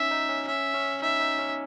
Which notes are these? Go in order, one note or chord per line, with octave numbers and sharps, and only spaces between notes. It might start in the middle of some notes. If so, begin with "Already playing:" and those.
Already playing: C#4 D#4 E5
D#4
C#4
C#4 E5
C#4
D#4 E5
D#4
C#4